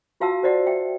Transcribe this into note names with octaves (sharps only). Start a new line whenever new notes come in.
F4 F#4 F5 F#5 A5 E6
F#4 C5 D5 D#5 F#5
E5 G5